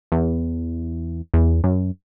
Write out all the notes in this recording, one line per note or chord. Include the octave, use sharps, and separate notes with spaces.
E2
E2
F#2